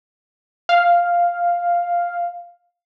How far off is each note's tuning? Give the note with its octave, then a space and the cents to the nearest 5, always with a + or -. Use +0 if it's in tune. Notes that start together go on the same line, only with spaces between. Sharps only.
F5 +0